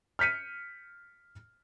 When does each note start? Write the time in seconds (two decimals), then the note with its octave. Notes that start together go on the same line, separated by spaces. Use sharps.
0.19 F6 G6 B6 C#7 D#7